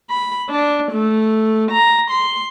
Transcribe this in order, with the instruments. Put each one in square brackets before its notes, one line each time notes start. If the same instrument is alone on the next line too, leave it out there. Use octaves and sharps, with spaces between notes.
[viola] B5
D4
A3
A#5
C6